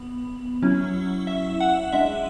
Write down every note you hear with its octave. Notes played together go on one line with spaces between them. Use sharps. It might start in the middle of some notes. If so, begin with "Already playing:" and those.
Already playing: B3
F#3 C#4 E4
E5
F#5
G#3 D4 E5